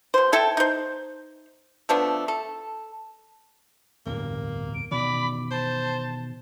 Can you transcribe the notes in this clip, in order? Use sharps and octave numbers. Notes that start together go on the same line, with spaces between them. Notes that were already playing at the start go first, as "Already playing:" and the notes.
B2 C5
E4 A4 G5 A5
D#4 C5
F3 A3 B3 D4
A4
D1 E2 G2 A#3
D7
B2 D#3 E3 D5 B5
C5 A5